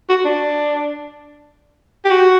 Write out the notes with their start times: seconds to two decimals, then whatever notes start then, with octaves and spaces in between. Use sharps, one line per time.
0.09 F#4
0.25 D4
2.05 G4
2.11 F#4